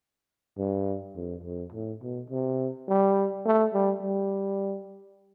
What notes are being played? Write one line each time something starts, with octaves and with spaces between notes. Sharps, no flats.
G2
F2
F2
A2
B2
C3
G3
A3
G3
G3